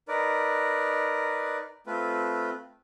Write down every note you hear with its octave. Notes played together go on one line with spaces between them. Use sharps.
D#4 A#4 B4 D5
A3 C4 F4 B4